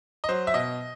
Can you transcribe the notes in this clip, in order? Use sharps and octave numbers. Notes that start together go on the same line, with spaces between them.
D#5
F#3 C5
E5
B2 D#5